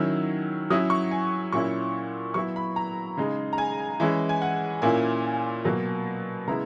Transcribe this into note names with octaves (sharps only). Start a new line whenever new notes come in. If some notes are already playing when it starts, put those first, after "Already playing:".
Already playing: D#3 F#3 C#4 E4 E6
F#3 C#4 E4 D#6
C#6
G#5
A#2 F#3 C#4 E4 C#6
F#3 B3 E4 C#6
B5
A#5
C#3 G#3 D#4
A#5
G#5
E3 G#3 C#4 E4
G#5
F#5
A#2 A#3 C#4 E4 G#5
B2 F#3 A#3
C#3 G#3 B3 E4 A#5